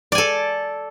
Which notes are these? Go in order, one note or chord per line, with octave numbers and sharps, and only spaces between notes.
A4 D5 G#5